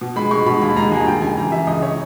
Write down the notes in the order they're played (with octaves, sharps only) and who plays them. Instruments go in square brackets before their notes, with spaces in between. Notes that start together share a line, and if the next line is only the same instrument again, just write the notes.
[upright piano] B2
G#3 B5
G#3 C#6
B2 B5
D#2 B5
G#3 A#5
D#2 G#5
D#2 G5
C#3 G#5
E3 A#5
E3 E5
C#2 D#5
C#5